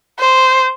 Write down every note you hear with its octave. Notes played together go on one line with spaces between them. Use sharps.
C5